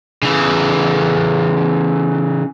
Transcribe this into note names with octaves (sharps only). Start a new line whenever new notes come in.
C#3 E3